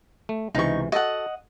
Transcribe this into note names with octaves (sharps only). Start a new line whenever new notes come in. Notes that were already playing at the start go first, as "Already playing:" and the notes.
A3
C#2 C3 E3 D#4 C#6
F#4 A4 D#5 F#5